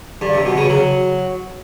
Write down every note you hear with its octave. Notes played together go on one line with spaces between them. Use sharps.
G2
C3
B2
C#3
F#3